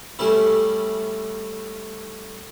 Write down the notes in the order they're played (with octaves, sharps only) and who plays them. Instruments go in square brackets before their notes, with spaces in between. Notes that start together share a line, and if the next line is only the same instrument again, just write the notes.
[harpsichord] G3 A3 C#4 E4